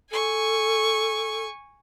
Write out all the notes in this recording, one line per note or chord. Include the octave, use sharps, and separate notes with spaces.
A4 G#5 C#6